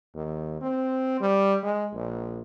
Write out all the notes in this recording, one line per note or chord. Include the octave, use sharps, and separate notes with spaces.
D#2
C4
G3
G#3
A#1